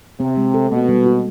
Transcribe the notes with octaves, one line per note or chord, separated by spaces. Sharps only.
C3 C4
G#3
A4
B2 A#3
G3
F#4